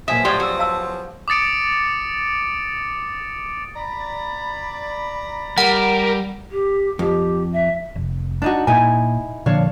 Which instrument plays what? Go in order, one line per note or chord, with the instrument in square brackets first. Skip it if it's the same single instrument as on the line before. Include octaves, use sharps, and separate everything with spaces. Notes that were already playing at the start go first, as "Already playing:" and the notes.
[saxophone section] E2 F3 F#3 [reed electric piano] A#2 G#5 D#6 [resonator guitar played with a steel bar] E5
[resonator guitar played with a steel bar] A2 G3 G5 [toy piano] G4 D5 D#6 [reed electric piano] C6
[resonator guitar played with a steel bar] F#4 [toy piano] G4 E6
[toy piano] F5 A5 E6
[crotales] D6 D#6 A6 C#7 D7
[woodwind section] D5 A#5 B5
[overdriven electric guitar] G3 [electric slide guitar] A#4 [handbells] F#5
[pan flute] G4
[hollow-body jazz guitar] F2 [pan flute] G4
[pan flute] E5
[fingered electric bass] F1
[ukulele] D4 D#4 F#4
[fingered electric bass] A#2 [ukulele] D#4 E4 G#5
[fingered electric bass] A#2 D3 F3 [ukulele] D4 C#5 F5